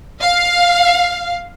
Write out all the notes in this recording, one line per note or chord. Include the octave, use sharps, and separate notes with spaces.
F5